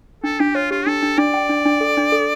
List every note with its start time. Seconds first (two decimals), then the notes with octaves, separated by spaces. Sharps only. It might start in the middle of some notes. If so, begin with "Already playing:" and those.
0.24 D4 A4
0.40 D4 G4
0.55 F4 C#5
0.71 F4 G4
0.86 D4 A4
1.02 D4
1.18 D4 D5
1.34 G5
1.49 D4
1.65 D4
1.81 A4
1.97 D4
2.12 A4